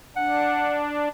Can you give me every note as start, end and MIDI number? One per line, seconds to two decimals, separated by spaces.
0.16 1.08 62
0.16 0.77 78